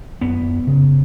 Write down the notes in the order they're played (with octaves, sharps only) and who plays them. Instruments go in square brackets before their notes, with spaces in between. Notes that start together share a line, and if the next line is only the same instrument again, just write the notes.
[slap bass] F#2 B3
C#3